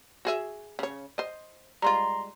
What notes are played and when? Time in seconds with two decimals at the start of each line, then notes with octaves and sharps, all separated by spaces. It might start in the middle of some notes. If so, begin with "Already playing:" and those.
0.25 F#4 G#4 E5
0.79 C#3 C#5
1.18 C5 D#5
1.82 G3 G#3 F4 A#5 C6